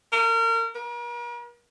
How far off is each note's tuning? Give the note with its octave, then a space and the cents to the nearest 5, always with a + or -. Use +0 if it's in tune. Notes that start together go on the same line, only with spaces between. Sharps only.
A#4 -35
A#4 +45